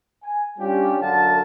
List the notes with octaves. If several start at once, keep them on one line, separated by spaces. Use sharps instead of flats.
G#5
G3 C#4 D4 F4 G4
F#2 D3 F#3 A4 F5 A5